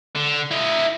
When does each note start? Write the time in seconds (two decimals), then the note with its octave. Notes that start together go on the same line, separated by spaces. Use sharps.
0.16 D3
0.51 E4 D#5